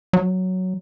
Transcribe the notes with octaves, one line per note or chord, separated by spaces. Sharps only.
F#3